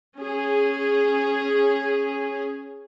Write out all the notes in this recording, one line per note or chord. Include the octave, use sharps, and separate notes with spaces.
C#4 G#4